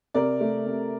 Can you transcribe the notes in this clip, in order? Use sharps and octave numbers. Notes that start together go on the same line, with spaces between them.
C3 A#4 D5
A3
C3